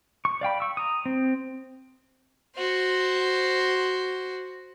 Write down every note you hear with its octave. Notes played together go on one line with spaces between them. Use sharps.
C#6
D5 F5 G5 B5
C#6 E6
A#5 D#6
C4
F#4 C5